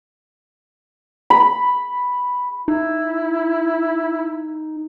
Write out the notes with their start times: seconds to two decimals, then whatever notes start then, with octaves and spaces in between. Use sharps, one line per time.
1.30 B5
2.68 D#4 E4